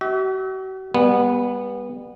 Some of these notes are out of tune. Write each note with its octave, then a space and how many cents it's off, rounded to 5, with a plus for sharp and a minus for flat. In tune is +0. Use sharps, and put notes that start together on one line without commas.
F#4 +40 E5 -30
G3 +30 B3 -15